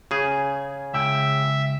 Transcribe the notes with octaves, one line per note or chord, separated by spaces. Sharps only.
C#3 G#4
C#2 E5 G5